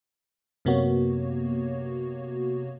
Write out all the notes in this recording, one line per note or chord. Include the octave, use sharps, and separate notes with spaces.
F#2 C3 A#3 B3 F#4 C#5